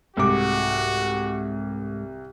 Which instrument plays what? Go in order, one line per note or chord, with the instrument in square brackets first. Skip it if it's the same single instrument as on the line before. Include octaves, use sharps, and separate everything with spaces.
[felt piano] C2 D6 [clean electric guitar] G#2 G#3 A3 [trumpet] F#4